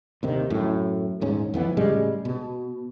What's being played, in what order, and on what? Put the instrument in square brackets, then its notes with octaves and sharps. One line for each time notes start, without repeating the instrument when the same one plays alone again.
[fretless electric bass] D#2 C3 D#3
F#2 A2
D#1 G#2 C#4
F2 E3 B3
A2 C#3 G3 G#3
B2